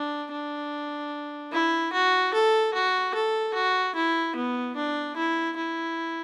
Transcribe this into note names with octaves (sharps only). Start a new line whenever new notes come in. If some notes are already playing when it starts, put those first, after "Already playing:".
Already playing: D4
D4
E4
F#4
A4
F#4
A4
F#4
E4
B3
D4
E4
E4